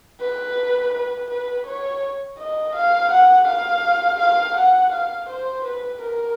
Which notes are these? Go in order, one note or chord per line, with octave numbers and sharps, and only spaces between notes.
B4
B4
B4
C#5
D#5
F5
F#5
F5
F5
F#5
F5
C5
B4
A#4